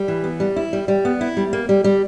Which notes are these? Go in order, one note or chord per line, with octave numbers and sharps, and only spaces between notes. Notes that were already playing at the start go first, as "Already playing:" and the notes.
Already playing: G3
E3
B3
G3
E4
G3
G3
B3
E4
G3
A#3
G3
G3